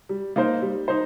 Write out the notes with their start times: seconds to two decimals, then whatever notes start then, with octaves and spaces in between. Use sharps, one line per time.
0.09 G3
0.36 A#3 D#4 C5
0.62 G3
0.88 D#4 C5